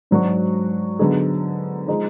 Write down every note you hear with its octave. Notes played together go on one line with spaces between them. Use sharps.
G#2 F#3 D4 F#4
D3 F#3 B3 D#4 G#4
F3 G#3 D#4 G#4